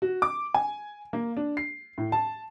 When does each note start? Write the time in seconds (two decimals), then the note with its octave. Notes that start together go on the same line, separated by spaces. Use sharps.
0.02 F#4
0.22 D6
0.54 G#5
1.13 A#3
1.37 D4
1.57 C7
1.98 A2
2.12 A5